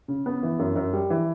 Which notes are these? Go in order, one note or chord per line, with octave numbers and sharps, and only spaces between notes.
C#3
B3
E3
F#2
F#2
G3
E3